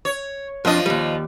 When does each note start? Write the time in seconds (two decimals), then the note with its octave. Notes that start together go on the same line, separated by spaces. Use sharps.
0.05 C#5
0.65 F2 F3 D4 F4 D#5
0.86 D#2 G3